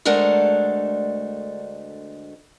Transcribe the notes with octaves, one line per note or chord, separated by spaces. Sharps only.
D2 G#3 A3 D4 A#4 F#5